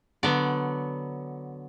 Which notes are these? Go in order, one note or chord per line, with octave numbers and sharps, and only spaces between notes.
D3 F#3 B3 D5